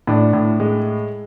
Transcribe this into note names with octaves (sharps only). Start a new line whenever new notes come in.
A2 D4
A2
G#3